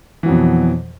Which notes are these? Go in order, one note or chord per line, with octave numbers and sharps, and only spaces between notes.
F2 B2 E3 F#3